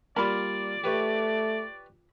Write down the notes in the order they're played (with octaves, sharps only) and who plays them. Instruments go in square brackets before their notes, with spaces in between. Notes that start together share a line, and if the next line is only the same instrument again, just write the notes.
[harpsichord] G3 A#3 A#4 [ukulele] F4 B5 [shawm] D5
[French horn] A3 [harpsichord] G4 B4 C#5